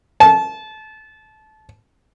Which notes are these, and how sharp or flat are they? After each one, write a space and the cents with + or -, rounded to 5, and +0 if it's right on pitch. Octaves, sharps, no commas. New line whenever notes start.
A5 -25